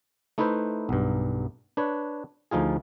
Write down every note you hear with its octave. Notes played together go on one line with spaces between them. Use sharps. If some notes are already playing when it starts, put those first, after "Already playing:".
A3 D#4 E4 B4 C5
B1 G2
D4 B4 C#5
D2 F3 D#4 F4 G#4